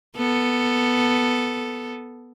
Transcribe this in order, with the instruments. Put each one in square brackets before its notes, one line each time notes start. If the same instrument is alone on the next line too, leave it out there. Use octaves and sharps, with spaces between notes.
[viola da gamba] B3 A4